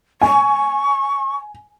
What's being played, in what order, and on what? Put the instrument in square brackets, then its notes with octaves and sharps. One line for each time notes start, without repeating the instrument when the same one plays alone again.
[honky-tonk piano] G#5 [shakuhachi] C#6